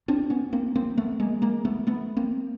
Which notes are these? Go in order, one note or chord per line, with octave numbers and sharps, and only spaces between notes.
C4 D4
B3 C#4
A#3 C4
A#3 C4
A3 B3
G#3 A#3
G#3 A#3
A3 B3
A3 B3
A#3 C4